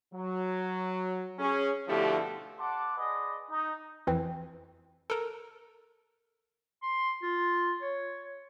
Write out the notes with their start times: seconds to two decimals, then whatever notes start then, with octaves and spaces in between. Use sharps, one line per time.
0.13 F#3
1.39 C#4 G#4
1.88 B2 D3 F3 A3 E4 G4
2.59 D5 F#5 A5 C6 D6
2.97 G#4 B4 D5 D#5
3.51 D#4
4.07 F2 E3 C4
5.10 A4 A#4
6.83 C6
7.22 F4
7.82 C#5